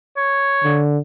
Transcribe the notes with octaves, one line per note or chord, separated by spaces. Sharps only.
C#5
D3